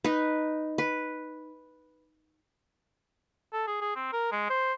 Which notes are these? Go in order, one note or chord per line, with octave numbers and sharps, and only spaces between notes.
D#4 B4
B4
A4
G#4
G#4
C4
A#4
G#3
C5